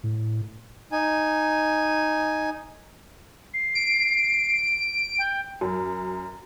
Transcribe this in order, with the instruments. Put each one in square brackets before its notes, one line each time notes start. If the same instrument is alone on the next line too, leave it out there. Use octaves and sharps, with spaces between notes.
[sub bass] A2
[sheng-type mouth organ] D#4 G#5
[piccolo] C7
[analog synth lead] D7
[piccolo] G5
[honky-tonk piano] F#2